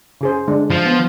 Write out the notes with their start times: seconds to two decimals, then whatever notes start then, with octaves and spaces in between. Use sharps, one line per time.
0.21 C#3 G#4 C5
0.48 D3 G#3 D4
0.70 F3
0.86 B3